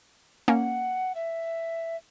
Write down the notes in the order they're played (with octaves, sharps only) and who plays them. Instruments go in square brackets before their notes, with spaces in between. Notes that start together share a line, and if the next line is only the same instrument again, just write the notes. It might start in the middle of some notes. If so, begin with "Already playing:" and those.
[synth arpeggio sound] A#3 C#4 [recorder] F#5
[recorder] E5